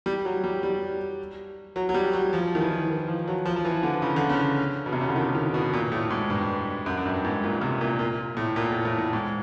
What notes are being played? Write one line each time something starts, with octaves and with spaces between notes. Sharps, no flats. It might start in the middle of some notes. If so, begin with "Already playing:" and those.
G3
F#3
G3
G3
F#3
F#3
G3
F#3
F3
D#3
E3
D#3
F3
F#3
F3
F3
E3
D3
C#3
D3
C#3
B2
C3
C#3
D3
D#3
D#3
B2
A#2
A2
G#2
G2
F#2
F#2
G2
G#2
A#2
C3
A#2
A#2
A2
A#2
A2
A2
A2
G#2